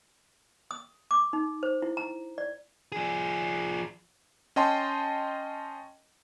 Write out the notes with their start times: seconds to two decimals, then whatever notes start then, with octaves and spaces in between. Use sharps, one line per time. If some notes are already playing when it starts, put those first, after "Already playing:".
0.71 D#6
1.11 D6
1.33 D#4
1.63 C5
1.82 E4
1.97 A#5
2.38 D5
2.92 F3 G#4
4.56 C#4 D#5 G5 A5 C6